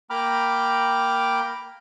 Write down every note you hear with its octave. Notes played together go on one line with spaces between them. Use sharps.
A#3 G5 A#5 B5 D6 F6